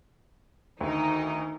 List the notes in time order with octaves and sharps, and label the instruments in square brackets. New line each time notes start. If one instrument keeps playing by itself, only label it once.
[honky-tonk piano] D2 [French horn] D#3 [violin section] D#4